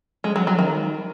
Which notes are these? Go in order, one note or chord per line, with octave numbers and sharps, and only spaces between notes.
G#3
F#3
F#3
D#3